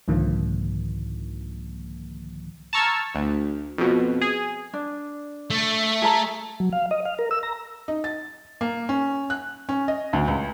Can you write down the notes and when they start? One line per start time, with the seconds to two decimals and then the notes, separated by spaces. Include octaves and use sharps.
0.08 C2 G#2 D3 D#3 F3 A#3
2.73 A5 A#5 C#6 E6 F6 G#6
3.15 D2
3.78 F2 B2
4.22 G#4
4.73 D4
5.50 A3
6.02 G#4 A4 A#5
6.60 F#3
6.73 F5
6.91 D#5
7.05 F5
7.19 A#4
7.31 E6
7.43 A#5
7.88 D#4
8.04 A6
8.61 A#3
8.89 C#4
9.30 F#6
9.69 C#4
9.88 D#5
10.13 D2
10.28 C#2